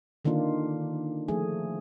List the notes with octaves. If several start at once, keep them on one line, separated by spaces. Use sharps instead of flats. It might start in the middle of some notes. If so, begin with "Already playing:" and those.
D3 D#3 A#3 D4 F4
F3 A3 G#4